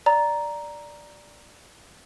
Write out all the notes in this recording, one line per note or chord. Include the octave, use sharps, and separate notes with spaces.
D5 A#5